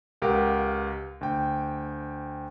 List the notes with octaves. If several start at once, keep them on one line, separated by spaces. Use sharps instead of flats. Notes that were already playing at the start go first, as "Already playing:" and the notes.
C#2 G4 A#4 F5 F#5
D2 G5